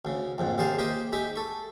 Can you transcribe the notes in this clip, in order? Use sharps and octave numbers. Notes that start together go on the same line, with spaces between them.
D2 C#3
A#1 F2 G#2
D#2 C3 G#4 C5 D5 F5
A#3 G4 A#4 C5 D#5
G#3 D#4 G4 E5
A4 C#6